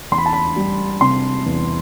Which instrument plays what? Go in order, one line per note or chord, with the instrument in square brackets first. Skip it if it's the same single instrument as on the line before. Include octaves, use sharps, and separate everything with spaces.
[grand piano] E2 C6
B5
A5
B5
G3
C3 C6
E2